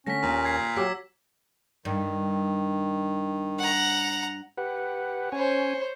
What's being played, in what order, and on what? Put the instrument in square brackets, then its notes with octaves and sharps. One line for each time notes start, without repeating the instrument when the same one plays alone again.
[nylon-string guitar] D3 A3 [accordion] C#4 [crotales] A#6 B6
[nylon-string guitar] D#2 [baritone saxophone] A#2
[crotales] G#6 C7
[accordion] F#3 [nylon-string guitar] A3 G4 G5 [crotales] D6 E6 B6
[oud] G2 [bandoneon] D#3
[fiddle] F#5 A#5
[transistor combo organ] G4 B4 F#5
[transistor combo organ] C#4 G#5 [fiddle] C5 C#5